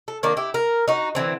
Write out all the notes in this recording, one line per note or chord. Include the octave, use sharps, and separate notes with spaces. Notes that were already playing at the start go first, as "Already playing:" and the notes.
A4
D#3 A#3 D4
E4 G4
A#4
D#4 F#4
D3 E3 C4